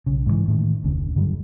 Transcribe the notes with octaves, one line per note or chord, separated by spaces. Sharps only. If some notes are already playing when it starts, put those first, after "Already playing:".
B1 C#3
G#2 D3 E3
A2 D#3
F1 D2 C#3
G2 D3 F#3 G3